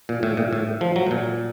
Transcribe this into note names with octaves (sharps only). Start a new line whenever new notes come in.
A#2
A2
A#2
A2
F3
F#3
A2
A#2